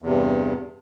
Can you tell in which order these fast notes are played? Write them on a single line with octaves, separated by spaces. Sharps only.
E2 C3 G2